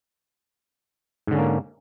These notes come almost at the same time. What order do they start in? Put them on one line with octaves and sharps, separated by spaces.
G#2 D3 C#4 A#3